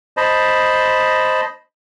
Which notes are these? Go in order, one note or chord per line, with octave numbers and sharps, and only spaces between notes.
C5 D#5 A5 B5